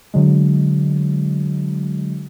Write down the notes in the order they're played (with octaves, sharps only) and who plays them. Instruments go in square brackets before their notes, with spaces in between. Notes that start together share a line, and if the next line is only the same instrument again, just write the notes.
[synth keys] D3 F#3 G#3